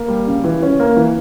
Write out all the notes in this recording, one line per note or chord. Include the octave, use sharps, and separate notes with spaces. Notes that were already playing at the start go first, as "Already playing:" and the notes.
Already playing: A#3
G3
C#3
E3
C#4
A#3
E3